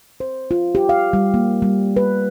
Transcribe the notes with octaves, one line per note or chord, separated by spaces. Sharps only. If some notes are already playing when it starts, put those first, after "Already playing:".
C5
F4
G4
F5
G3
A#3
G3
B4